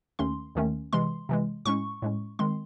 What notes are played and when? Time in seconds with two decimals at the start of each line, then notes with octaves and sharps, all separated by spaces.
0.19 D#2 D#3 A3 C#4 C6
0.55 D#2 D#3 A3 C#4
0.93 C3 E3 G#3 C6
1.29 C3 E3 G#3
1.65 A2 G#3 C#4 C#6
2.02 A2 G#3 C#4
2.39 D#3 G#3 C4 C6